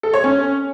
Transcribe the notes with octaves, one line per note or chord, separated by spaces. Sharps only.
A4
C#5
C#4